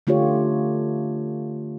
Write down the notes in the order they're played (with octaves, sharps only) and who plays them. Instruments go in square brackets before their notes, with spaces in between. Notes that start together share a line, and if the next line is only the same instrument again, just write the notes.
[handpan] D3 A3 F4 G4 C#5